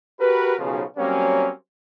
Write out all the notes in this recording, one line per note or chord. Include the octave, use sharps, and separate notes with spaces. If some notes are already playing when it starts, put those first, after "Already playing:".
F#4 G4 A#4 B4
B1 C#3 F3
F#3 G3 A#3 C4 C#4